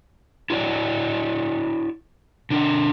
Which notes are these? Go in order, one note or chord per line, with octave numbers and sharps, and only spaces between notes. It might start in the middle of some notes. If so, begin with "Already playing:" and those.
E4 F#4 A#4 C#5 D5
D3 D4 A#4